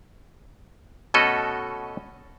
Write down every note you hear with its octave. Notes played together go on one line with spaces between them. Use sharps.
B2 A3 C#4 F#4 A4 D#5